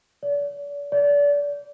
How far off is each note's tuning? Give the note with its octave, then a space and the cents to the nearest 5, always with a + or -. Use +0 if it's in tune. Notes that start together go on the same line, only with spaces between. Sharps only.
D5 -40
D5 -30